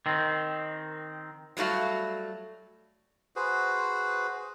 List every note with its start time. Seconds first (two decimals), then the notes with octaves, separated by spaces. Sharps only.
0.06 D#3 C4
1.57 F#3 G3 A3 F#4 F5
3.36 F#4 G#4 B4 C5